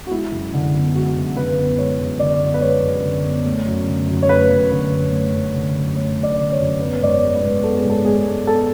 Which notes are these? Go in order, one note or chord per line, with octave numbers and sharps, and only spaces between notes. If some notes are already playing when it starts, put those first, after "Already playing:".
F#4
G#3 E4
F#2
D3
B3
G#3 F#4
F#2
D3 B4
B3
G#3 C#5
F#2
D3 D5
B3
B4
G#3 C#5
F#2
D3
B3
A3
F#2
D3
F#2
C#5
A3 B4
F#2
D3 B4
F#2
A3
F#2
D3
F#2
A3 C#5
F#2
D5
D3
C#5
F#2
B3 B4
G#2 D5
C#5
G#3
B4
G#2
B3 A4
G#4
G#2
A4
G#3 G#4
G#2
B3 A4